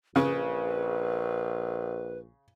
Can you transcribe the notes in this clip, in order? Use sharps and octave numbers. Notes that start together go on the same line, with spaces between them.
A#1 C#3 B4